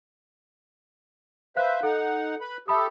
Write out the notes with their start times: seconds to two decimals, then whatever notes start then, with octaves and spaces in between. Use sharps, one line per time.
1.56 B4 C5 E5 F5 F#6
1.83 D#4 A4 F#5
2.41 B4 B5
2.68 G4 A4 E5 B5 D#6